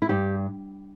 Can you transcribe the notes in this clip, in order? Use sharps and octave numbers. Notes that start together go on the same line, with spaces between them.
E4
G2 G4